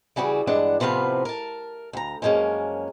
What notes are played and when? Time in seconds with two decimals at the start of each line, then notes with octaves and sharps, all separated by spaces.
0.16 C#3 E3 G3 F#4 G#4
0.47 G2 E3 G#3 D4 F#5
0.80 A2 C3 F3 B3 F5
1.25 A#4 A5
1.93 D2 A#5
2.22 F#2 F3 G#3 A#3 C#4